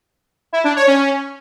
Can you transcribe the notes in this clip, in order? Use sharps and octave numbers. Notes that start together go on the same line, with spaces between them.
E4
D4
C#5
C#4